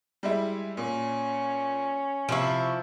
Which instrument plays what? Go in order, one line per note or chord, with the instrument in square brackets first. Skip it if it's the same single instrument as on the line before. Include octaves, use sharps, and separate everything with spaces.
[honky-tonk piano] G3 G#3 E4
[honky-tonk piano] A#2 [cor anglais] C#4
[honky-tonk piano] C3 C#6 [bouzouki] F3 E4